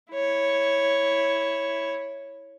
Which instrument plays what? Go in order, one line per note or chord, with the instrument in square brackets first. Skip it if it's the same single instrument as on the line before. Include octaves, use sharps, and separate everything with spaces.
[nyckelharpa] E4 C#5